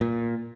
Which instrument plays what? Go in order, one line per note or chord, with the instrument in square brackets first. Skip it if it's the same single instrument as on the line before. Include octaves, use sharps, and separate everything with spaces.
[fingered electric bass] A#2